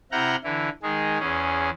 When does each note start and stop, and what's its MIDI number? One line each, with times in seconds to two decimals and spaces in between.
0.12 0.36 48
0.12 0.36 64
0.12 0.36 78
0.12 0.36 82
0.12 0.36 89
0.12 0.36 91
0.44 0.69 50
0.44 0.69 52
0.44 0.69 64
0.83 1.19 51
0.83 1.19 56
0.83 1.19 68
1.20 1.70 40
1.20 1.70 61
1.20 1.70 68